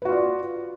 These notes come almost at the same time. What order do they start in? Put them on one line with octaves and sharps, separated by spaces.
B4 F#4 F4 D5